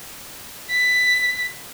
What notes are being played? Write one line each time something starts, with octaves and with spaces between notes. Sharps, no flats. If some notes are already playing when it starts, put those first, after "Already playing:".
B6